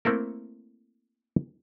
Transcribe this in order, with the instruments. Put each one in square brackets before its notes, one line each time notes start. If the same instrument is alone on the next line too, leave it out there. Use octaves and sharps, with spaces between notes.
[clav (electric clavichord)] A3 A#3 C4 E4 A4 A#4